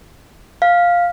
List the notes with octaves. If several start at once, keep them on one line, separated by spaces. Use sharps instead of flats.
F5